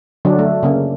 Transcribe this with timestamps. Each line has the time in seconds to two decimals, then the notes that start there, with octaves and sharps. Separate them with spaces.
0.25 D3 F#3 D4
0.39 A3
0.63 C#3 A#3